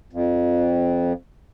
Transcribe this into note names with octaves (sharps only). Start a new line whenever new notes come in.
F2